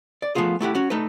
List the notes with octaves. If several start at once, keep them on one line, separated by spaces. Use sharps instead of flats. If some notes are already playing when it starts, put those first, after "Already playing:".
D5
F3 F#3 A3 B3 F4 G#4
A3 E4 G4 F#5
C#4 F#4
A3 D#4 A4 B4